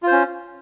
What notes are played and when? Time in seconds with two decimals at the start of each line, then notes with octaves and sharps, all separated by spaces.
0.03 F4
0.07 C5
0.12 C#4